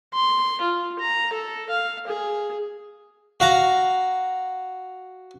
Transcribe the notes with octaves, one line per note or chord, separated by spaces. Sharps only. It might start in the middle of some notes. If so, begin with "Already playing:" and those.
C6
F4
A#5
A4
F5
G#4
F#4 F5 A#5